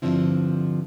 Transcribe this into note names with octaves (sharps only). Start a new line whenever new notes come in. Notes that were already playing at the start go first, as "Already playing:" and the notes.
G2 A#2 D3 F3 C4 E4